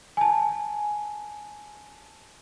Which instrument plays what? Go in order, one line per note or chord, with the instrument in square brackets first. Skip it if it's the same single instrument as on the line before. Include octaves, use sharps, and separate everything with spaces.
[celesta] G#5 A5